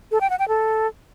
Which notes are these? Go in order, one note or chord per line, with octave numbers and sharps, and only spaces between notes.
A4
G5
F#5
G5
A4